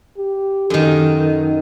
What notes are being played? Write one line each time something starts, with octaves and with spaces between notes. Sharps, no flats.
G4
F#2 D#3 A4